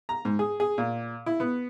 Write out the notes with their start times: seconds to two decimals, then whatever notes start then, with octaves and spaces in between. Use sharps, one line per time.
0.09 A#5
0.25 G#2
0.39 G#4
0.60 G#4
0.78 A#2
1.26 E4
1.40 B3